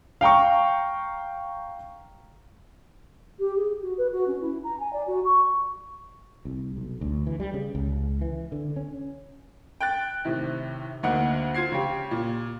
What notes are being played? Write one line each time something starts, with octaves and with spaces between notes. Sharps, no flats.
F5 G5 A#5 C#6
G4
G#4
F#4
B4
F#4
C#4
E4
A#5
G#5
D5
F#4
C#6
C2
B1
D2
E3
G3
C#3
C#2
E3
D3
C#4
G5 F#6 A6
A2 C3 D#3
D2 D3 A#3 D#4 F#5
F4 C5 G#6 C7
C#3 G4
A#2